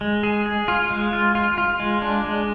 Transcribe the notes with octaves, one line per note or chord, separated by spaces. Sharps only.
G#3
G#4
G#4
F4
G#3
F4
F4
F4
G#3
D4
G#3